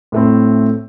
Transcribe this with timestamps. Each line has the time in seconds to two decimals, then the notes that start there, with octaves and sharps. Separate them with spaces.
0.12 A2 A3 C4